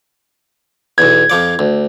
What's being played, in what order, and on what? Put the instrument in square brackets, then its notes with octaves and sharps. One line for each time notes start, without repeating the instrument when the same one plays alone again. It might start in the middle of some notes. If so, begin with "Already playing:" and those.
[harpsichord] B1 E2 [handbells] G#6
[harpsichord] F2 F3 D5
D2